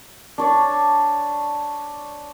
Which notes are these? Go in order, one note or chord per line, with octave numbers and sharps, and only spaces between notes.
D4 C#5 D5